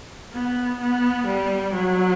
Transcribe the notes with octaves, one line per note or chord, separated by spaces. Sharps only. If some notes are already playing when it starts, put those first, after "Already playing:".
B3
B3
G3
F#3